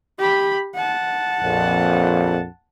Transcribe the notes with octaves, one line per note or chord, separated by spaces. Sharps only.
G4 B5
F#5 A5
A#1 F2